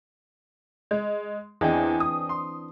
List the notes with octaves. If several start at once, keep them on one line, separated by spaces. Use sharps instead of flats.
G#3
E2 E3 C4 D4 G#4 D#5 G5
D#6
C6